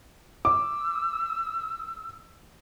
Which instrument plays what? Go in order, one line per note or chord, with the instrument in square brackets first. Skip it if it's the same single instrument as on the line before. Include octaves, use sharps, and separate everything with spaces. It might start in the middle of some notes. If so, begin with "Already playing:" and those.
[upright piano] D6 [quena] E6